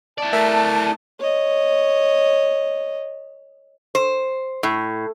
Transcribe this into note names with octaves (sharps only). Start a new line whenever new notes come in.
E4 D5 A5
A3 A#4 E5
C#5 D#5
C5
A2